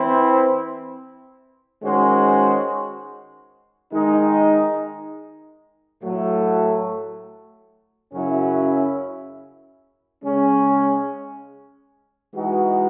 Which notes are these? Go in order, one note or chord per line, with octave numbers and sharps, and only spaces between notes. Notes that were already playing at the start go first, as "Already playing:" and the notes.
Already playing: E3 C4 E4 C5
D#3 G#3 C#4 F#4 C5
D#3 G#3 D#4
A2 F#3 A3
F#2 C#3 F#3 C#4 E4
C#3 G#3 C#4
E3 G#3 D#4 F#4